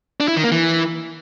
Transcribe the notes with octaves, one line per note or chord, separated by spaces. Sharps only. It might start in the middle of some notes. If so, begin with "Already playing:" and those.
D4
E4
D#3
A#3
E3